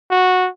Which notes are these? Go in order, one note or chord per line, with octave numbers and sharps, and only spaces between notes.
F#4